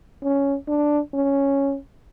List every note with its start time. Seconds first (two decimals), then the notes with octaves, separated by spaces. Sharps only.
0.24 C#4
0.68 D4
1.14 C#4